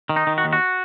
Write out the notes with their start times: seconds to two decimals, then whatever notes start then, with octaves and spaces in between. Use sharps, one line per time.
0.09 D#3
0.16 D#4
0.27 D#3
0.38 F#4
0.44 D#2
0.53 F#4